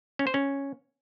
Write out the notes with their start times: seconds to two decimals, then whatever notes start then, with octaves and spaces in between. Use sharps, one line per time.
0.19 C#4
0.27 C5
0.34 C#4